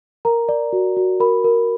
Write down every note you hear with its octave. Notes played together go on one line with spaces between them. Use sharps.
A#4 A#5
D5
F#4
F#4
A#4 B5
A#4